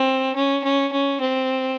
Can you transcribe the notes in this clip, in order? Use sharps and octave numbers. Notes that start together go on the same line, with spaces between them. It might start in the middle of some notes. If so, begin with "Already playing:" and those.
Already playing: C4
C#4
C#4
C#4
C4